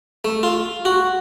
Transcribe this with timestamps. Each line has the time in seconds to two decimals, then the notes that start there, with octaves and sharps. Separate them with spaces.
0.25 A3
0.43 F4
0.85 F#4